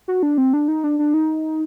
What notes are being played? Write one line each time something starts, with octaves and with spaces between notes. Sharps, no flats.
F#4
D4
C4
D4
D#4
D4
D4
D#4